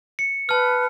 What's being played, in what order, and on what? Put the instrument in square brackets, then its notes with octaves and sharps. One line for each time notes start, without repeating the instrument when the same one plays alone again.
[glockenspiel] C#7
[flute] B4 [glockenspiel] A5 F6